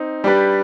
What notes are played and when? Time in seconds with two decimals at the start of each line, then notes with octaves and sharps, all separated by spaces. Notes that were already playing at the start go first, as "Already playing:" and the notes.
Already playing: C4 D#4
0.24 G3 D4 G4 B4 D5